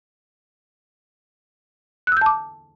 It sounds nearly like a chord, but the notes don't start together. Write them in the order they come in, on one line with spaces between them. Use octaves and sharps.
F#6 E6 G6 A5 D6